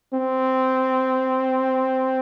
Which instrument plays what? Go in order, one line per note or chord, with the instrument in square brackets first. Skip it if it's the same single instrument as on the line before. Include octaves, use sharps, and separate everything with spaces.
[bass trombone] C4